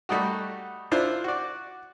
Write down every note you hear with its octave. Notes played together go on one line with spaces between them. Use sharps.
G3 A3 D#4 F#4
D4 E4 F4 C5
F#4 D5